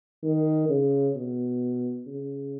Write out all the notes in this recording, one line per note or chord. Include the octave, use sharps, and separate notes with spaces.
D#3
C#3
B2
C#3